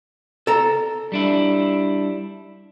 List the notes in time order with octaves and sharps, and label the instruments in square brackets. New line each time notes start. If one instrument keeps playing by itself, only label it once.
[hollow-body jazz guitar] A4 A#5
[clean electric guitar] G3 D4 E4